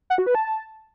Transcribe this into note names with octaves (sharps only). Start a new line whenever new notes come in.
F#5
F#4
B4
A5